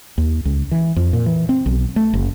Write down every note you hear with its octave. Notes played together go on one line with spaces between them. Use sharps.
D#2
C#2
E3
F2
A#2
E3
C4
B1
A3
F#1